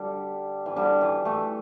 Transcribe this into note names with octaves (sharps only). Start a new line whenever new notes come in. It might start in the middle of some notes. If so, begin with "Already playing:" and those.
Already playing: D3 G3
E3
D3 G3
E3
E3 A3